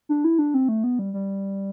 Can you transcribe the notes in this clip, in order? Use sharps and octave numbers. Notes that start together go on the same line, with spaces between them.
D4
E4
D4
C4
A3
B3
G3
G3